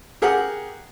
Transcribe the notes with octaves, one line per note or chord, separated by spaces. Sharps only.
G4 G#4 A#4 F#5